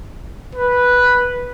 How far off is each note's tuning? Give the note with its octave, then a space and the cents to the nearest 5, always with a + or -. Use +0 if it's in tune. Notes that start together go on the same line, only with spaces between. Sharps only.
B4 -5